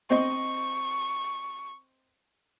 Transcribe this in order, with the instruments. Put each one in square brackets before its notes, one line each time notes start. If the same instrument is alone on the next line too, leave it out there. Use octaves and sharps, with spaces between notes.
[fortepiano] C4 D#5 [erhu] C#6